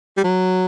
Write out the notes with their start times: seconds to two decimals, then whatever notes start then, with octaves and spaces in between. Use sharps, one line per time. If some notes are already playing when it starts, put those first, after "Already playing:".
0.17 G3
0.24 F#3